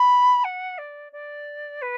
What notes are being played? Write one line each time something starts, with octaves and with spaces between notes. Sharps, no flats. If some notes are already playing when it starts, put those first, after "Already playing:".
Already playing: B5
F#5
D5
D5
B4